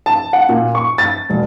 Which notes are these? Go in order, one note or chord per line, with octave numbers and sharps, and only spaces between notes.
A5
F#5
A#2
C#6
A6
E1